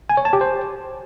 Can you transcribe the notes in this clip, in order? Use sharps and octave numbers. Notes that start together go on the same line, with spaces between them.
G#5
C#5
A5
G4
C5